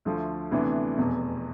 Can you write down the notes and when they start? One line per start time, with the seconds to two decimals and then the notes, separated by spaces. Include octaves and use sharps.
0.05 D2 D3 F3 A3
0.51 D2 C3 E3 B3 D4
0.97 F1 E2 B2